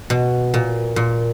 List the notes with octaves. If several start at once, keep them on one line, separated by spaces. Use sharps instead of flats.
B2
A#2
A#2